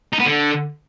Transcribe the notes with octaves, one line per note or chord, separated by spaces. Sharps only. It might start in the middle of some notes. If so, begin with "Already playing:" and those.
D#4
B3
D3